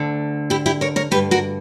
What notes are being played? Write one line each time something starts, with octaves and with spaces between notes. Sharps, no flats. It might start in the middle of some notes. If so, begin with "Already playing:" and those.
Already playing: D2 D3
E4 G4
E4 G4
A#4 C#5
A#4 C#5
G2 D3 G4 B4
F#4 A#4